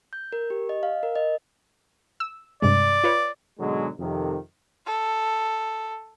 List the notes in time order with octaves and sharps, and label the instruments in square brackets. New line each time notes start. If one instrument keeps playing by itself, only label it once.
[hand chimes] G6
A#4
G4
D#5
F5
A#4
D#5
[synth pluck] E6
[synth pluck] G2 C3 G#3 [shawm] D5
[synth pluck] F4 B4 C#5
[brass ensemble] G#2 B2 D3 F#3 G#3
F2 C3 D#3
[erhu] A4